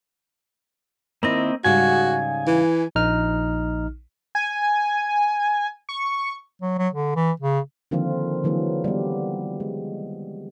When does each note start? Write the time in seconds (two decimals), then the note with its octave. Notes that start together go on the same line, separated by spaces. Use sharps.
1.23 D#3 A#3 C4 E4 D#5
1.64 G#2 C#3 G3 F#4 G#5
2.47 E3
2.95 A#1 D#4 F6
4.35 G#5
5.89 C#6
6.62 F#3
6.79 F#3
6.93 D3
7.16 E3
7.40 C#3
7.91 D3 D#3 F3 A#3 C4 F4
8.44 D3 E3 F#3 A#3 G#4
8.84 G3 B3
9.60 G#3